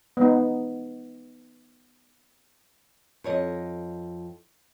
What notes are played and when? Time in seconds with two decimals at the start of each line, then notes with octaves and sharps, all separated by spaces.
0.17 B3 D#4
3.24 F2 C#5 D#5